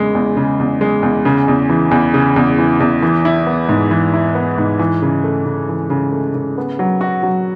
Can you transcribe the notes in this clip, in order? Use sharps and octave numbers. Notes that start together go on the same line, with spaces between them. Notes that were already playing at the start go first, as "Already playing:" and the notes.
Already playing: E2 C#3 G#3
E2
C#3
E2
G#3
E2
C#3
E2
E3
E2
C#3
E2
E3
E2
E3
E4
B3
G#2
E3
E4
B3
G#2
E3
C#3
A3
C#3
E3
C#3
A3
C#3
B3
F#3
F#4
F#3